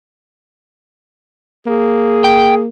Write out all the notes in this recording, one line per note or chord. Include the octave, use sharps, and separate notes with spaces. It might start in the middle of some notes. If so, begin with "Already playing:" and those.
A#3 G#4
G5